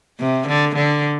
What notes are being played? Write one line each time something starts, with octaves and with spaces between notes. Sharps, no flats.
C3
D3
D3